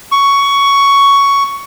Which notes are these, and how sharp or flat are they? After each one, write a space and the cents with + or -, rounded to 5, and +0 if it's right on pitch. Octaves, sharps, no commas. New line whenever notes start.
C#6 +10